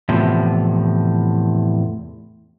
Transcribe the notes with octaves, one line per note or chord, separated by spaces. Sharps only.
E2 A2 C3 F3